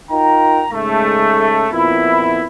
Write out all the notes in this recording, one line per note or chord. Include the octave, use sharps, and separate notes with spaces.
D#4 F4 A#4 G5 A#5
G#2 C#3 G#3 A3
F2 A#2 B3 E4